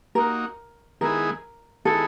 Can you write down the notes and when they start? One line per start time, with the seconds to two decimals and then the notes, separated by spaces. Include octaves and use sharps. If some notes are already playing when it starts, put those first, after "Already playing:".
0.15 A#3 D#4 F#4 A#4
1.01 D#3 G#3 B3 E4 G#4 A#4
1.85 D#3 G#3 B3 E4 G#4 A4